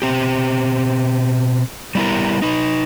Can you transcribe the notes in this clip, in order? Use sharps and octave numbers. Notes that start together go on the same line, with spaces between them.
B2 C4 G4
G3 B3 E4 G4 A#4
D#4 B4